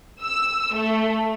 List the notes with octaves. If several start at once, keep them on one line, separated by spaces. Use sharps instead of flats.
E6
A3